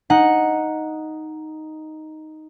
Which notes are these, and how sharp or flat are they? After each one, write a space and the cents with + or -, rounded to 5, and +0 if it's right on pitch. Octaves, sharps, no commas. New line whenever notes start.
D#4 +0 F#5 -10